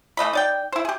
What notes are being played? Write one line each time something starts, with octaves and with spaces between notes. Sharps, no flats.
E3 A3 D#5 B5
D#4 D5 G5
E4 C5
G4 G#4